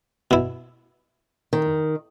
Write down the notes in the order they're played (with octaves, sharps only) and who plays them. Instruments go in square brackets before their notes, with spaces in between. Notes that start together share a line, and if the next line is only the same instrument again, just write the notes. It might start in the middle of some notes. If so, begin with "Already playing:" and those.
[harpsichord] B2 E4
[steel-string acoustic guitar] D#3